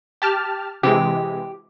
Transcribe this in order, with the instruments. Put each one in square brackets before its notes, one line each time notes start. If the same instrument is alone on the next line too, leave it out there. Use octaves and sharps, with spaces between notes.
[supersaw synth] G4 A5 F6
[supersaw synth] C3 E3 G#3 [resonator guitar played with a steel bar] G4